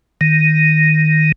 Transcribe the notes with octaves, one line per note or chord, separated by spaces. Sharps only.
D#3